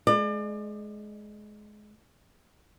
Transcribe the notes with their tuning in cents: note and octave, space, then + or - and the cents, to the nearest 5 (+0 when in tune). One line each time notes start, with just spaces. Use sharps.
G#3 +25 D5 +35